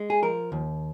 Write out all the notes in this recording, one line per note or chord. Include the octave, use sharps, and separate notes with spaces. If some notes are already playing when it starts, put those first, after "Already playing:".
Already playing: G#3
G#4
F3 A#4
D#2